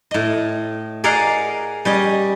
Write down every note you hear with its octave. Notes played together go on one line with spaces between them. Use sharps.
A2 D#5
G#4 A#4 D5 D#5 F5 F#5
G3 C#4 D#5